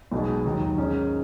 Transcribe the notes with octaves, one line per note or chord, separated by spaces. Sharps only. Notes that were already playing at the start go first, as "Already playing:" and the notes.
B1 B2 G#3
D#2 D#3 F#3
G#2 D#3 G#3 C#4